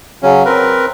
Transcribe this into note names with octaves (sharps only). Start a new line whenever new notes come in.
C#3 F#3 C#4
C4 A#4 B4